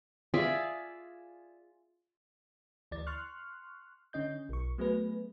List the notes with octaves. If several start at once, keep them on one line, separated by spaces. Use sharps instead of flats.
F4 G#4 D5 E5
D2 E3 D5 A6
C6 C#6 F6 F#6
D3 C#4 D#5 G6
B1 C#6
F#3 A3 B3 G#4 B4